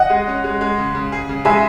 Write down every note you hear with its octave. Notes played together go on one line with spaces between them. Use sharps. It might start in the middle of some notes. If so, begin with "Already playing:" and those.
Already playing: D#5 F#5
G#3
C#4
G#3
G#3
C#3
C#3
G#4
C#3
G#3 E5 G#5